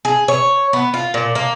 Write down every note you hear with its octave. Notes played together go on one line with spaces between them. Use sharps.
G#4
C#5
B3
F4
A#2
A#3